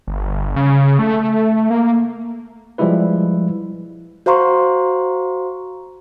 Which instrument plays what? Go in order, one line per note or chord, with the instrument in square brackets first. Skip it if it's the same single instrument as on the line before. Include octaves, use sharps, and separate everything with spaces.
[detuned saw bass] G1
C#3
A3
A#3
[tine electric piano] F3 G3 G#3 E4 B4
[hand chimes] F#4 C5 F5 A#5 C6 C#6